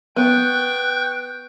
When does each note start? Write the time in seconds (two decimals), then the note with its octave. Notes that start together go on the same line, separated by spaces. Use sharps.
0.16 B3 G5 C#6 F#6 G6